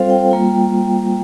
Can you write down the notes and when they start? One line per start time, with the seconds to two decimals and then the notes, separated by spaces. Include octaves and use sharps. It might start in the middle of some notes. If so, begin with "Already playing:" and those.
Already playing: G3 C4 F4 A4 C5 F5
0.10 G5
0.31 G3 A#3 F4